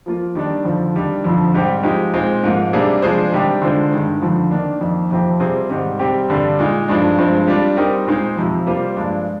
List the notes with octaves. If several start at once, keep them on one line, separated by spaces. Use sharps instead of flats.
F3 A#3 F4
D#3 G3 D4
F2 D3 F3
D#3 G3 D4
F2 D3 F3
G#2 G3 C4 G4
F3 G#3 D#4 G4
A#2 G#3 C4
G#2 F3 A#3
C3 G3 A#3 D4 G#4
F3 G#3 D4 G#4 C5
C3 D#3 G3 D4 G4
D3 G#3 D4 F4 C5
G2 D#3 G#3
F2 D3 F3
D#3 A#3 D4
F2 D#3 A#3
F2 C3 F3 C4 G4
C3 G3 C4 F4 G#4
G#2 D#3 G3 C4
C3 G3 C4 G4
G2 D3 G3 D4
A#2 G#3 D#4
G2 F3 G#3 D4
G2 F3 G#3 C4
G3 D4 F4
G3 C4 D#4 G4 A#4
A#2 G#3 D#4 G#4 C5
F2 C3 F3
G3 A#3 F4 C5
G2 F3 G#3 D4